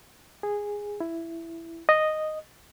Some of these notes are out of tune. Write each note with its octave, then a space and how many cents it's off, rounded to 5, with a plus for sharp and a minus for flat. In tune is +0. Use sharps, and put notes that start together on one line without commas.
G#4 -10
E4 +10
D#5 -5